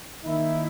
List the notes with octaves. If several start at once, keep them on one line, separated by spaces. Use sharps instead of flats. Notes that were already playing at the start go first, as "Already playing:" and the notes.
D#3 A#3 D#4 E4